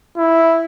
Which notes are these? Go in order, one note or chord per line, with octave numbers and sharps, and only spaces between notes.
E4